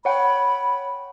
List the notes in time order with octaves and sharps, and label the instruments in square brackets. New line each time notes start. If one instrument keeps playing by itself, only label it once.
[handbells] C#5 F#5 G5 [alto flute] B5